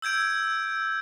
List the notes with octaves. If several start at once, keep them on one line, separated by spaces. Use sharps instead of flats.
E6 G6 G#6 D7